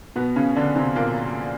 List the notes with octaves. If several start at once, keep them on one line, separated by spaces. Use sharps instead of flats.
B2 B3
C#3 C#4
D3 D4
C3 C4
A#2 A#3